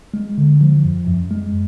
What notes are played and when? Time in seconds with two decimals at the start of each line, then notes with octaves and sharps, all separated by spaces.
0.14 G#3
0.38 D3
0.61 F3
0.85 F#2
1.07 F#2
1.31 G#3